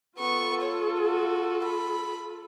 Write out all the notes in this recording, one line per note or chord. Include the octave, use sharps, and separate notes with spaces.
B3 F4 A4 C#6
C#5
F#4
B5